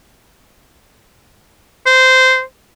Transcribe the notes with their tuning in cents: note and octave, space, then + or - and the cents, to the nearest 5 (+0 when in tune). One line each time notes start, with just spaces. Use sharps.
C5 -15